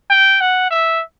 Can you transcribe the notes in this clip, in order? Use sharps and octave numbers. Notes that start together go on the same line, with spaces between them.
G5
F#5
E5